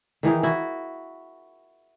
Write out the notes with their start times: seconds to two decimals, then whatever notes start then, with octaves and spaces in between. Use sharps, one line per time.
0.23 D#3 E3 D#4 G#4
0.43 E4 F#4